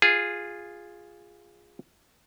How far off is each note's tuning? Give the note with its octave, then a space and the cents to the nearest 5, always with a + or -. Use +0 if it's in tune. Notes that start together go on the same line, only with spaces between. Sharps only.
F4 +0 G#4 -10